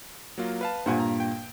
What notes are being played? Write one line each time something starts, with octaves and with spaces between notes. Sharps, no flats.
F#3 A#3 F4
B4 F5 A5
G2 A#2 C5 F#5 G#5
A#5
G5